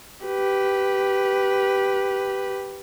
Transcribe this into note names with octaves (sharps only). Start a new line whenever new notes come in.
G4 B4